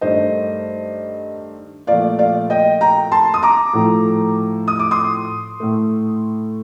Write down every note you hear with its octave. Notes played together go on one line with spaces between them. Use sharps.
G2 D#3 A3 C5 D#5
A#2 F3 A3 D5 F5
D5 F5
D#5 G5
G5 A#5
A5 C6
D#6
A#5 D6
A2 F3 A3
D#6
D6
C6 D#6
A2 A3